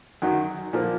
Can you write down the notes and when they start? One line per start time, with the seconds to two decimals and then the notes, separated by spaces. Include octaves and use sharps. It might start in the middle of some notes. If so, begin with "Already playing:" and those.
0.22 F#2 D#3 F#3
0.73 A#2 F3 A#3